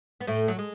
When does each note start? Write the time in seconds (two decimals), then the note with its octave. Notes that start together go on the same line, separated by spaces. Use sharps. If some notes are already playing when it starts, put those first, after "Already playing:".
0.21 B3
0.27 A2 A3
0.48 F#3
0.59 G#3